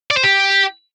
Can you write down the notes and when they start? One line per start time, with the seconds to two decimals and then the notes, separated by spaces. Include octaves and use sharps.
0.11 D5
0.17 C5
0.24 G4